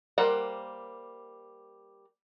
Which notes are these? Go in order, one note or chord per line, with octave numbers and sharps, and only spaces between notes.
G3 A#3 C5 F#5